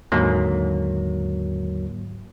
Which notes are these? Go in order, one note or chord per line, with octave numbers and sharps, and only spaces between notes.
D#2 G#2 D3 F#3 A#3